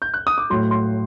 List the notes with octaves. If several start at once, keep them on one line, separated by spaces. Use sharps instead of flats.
G6
F#6
D#6
D6
A2 F#3 C6
C6